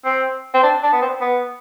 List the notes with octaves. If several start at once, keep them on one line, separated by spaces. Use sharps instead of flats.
C4
C4
D4
D4
B3
C4
B3